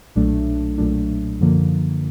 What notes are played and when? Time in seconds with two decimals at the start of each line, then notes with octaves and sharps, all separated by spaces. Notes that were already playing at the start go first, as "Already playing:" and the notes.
0.16 B1 A#2 F#3 A3 D4
0.78 B1 A#2 F#3 A3 D4
1.40 F#2 D3 F3 A#3